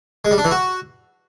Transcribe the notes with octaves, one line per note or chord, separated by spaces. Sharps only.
G#3
G3
D4
E3
F#4